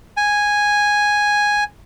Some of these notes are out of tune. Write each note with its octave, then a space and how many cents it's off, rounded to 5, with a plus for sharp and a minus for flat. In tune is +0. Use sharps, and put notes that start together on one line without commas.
G#5 -5